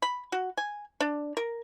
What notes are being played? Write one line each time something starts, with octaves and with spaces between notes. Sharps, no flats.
B5
F#4
G#5
D4
A#4